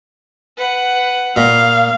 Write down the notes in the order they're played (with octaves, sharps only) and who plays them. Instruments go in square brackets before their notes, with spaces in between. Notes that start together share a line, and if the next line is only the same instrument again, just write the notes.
[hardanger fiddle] B4 F#5
[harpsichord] A#2 [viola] F5